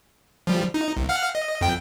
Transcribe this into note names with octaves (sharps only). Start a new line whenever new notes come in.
F3 G3
D#4
C2
F5 F#5 F6
D#5
F2 G5